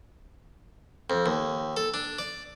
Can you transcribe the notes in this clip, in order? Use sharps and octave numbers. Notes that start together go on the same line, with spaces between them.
F2
D#2
A4
D4
D5